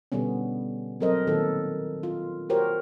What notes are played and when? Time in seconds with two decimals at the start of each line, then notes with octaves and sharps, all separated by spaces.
0.12 B2 D3 G3 B3 C#4
1.00 F#3 C4 A4 A#4 C5 D#5
1.27 A#2 D#3 A4
2.03 F4
2.50 F#4 G4 A#4 C5 C#5